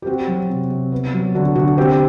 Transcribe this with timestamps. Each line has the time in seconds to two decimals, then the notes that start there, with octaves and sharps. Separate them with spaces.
0.02 G4
0.06 C4 F#4
0.27 F#3
0.49 C3
0.70 C3
0.92 B3
1.13 F#3
1.35 D3 F#4
1.55 D3 F#4
1.77 C4 G4